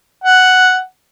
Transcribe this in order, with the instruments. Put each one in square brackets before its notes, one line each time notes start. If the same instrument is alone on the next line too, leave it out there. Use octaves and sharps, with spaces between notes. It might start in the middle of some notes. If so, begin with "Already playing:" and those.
[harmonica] F#5